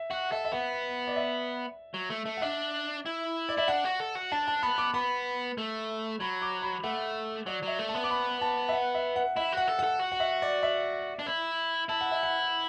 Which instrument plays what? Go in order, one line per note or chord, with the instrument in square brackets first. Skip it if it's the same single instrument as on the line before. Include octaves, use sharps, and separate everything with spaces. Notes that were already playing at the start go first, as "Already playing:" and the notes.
Already playing: [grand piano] E5
[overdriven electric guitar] F#4 [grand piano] F#5
[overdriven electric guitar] A4 [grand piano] E5
[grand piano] E5
[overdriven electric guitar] B3 [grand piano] F#5
[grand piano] D5
E5
[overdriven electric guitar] F#3
A3
A3
[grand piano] F#5
[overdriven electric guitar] D4 [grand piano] E5
[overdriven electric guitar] E4
[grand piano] D5
[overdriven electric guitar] E4 [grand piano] E5
[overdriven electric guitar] D4 [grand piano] F#5
[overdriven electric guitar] F#4
A4
F#4
[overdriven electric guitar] D4 [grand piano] A5
[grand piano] A5
[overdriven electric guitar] B3 [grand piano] B5
[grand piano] D6
[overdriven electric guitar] B3 [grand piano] B5
[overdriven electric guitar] A3
[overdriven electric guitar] F#3 [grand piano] B5
[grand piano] D6
B5
[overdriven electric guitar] A3 [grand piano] F#5
[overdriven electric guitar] F#3 [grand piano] D5
[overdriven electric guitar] F#3 [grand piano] E5
[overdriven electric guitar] A3
[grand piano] A5
[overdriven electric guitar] B3
[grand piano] D6
B5
A5
E5
F#5
E5
F#5
[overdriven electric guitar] E4 [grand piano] E5
[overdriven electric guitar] F#4 [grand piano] F#5
[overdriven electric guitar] A4
[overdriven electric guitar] A4 [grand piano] F#5
[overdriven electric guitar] F#4
[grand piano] F#5
E5
D5
E5
[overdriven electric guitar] D4
E4
[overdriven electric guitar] E4 [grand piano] A5
[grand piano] F#5
E5
F#5